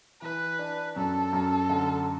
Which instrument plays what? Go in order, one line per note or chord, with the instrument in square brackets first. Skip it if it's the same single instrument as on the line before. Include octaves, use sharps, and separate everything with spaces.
[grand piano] E3 [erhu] B4
[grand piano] D4
[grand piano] F#2 [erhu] A4
[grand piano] F#2
D3